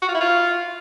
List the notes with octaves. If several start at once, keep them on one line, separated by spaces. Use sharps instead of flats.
F#4
F4
E4
F4